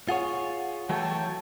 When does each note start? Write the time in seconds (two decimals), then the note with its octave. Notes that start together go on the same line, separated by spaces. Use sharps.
0.09 F4 G#4 C#5 F#5
0.90 E3 F#3 A3 C#5 G5 A5